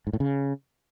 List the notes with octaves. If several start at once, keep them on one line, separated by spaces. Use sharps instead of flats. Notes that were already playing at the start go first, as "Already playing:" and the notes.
G#2
A2
C#3